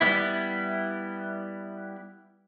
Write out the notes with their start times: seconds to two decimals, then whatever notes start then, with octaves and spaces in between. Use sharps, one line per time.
0.01 G3 B3 E4